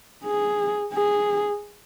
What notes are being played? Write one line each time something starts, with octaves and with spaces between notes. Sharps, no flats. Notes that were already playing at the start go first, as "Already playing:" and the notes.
G#4
G#4